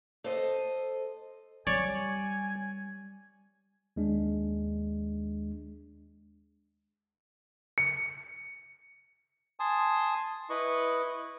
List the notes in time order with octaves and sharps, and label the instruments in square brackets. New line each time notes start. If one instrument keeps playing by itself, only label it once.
[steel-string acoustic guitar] A4 C5 D#5
[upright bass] G3 [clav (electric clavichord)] C#5 D5 [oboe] G#5
[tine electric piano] D#2 G#3 D4
[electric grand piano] C#7
[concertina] G#5 A5 C6 D#6
E4 B4 D#5 C#6